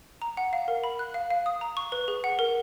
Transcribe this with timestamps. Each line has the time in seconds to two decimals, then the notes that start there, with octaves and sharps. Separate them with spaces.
0.22 A#5
0.37 F#5
0.53 F5
0.68 A#4
0.84 B5
0.99 F#6
1.14 F5
1.30 F5
1.46 D#6
1.61 A#5
1.77 C#6
1.92 B4
2.08 G#4
2.24 F#5
2.39 A#4